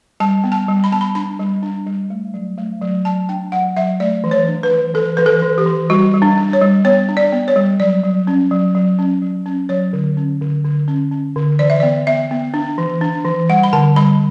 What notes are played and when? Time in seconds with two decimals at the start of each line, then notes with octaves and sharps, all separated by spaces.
0.20 G3 A5
0.44 B3
0.52 A5
0.68 G3
0.84 B5
0.92 B3 A5
1.01 B5
1.15 D4 B5
1.39 G3
1.63 D4
1.86 G3
2.10 A3
2.34 F#3
2.58 A3
2.81 F#3
3.05 F#3 A5
3.29 D4 G5
3.52 F#3 F#5
3.76 F#3 E5
4.00 A3 D5
4.24 E3
4.31 C#5
4.48 D4
4.63 B4
4.71 E3
4.94 E3 A4
5.17 E3 B4
5.26 A4
5.43 E3
5.58 G4
5.66 E3
5.90 G3 F#4
6.14 G3
6.22 D4
6.38 D4
6.53 C#5
6.61 G3
6.85 B3 C#5
7.09 D4
7.17 D5
7.33 B3
7.48 C#5
7.56 G3
7.80 F#3 D5
8.04 F#3
8.27 C#4
8.51 F#3
8.75 F#3
8.99 C#4
9.22 F#3
9.46 C#4
9.69 F#3 C#5
9.93 D3
10.17 C#4
10.41 D3
10.64 D3
10.88 C#4
11.11 C#4
11.36 D3
11.59 E3 D5
11.70 E5
11.80 B3 D5
12.07 B3 E5
12.31 B3
12.54 D4
12.78 E3
13.01 D4
13.25 E3
13.49 G3 F#5
13.63 B5
13.73 D3 A5
13.96 G3 B5